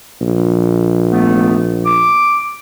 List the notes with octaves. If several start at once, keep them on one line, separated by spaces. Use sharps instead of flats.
A#1
A3 B3
D6